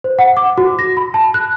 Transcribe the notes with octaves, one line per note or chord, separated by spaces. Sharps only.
C5
F#5
D6
F#4
A#6
B5
A5
F#6